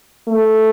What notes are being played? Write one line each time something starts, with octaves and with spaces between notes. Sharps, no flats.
A3